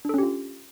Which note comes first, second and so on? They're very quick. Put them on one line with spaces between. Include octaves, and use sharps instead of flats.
D4 A4 C#4 G4 F4